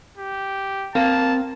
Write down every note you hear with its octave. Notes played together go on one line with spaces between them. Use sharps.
G4
A#3 C4 A5